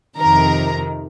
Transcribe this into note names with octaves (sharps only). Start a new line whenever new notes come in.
F2 C3 D#3 A#4 A#5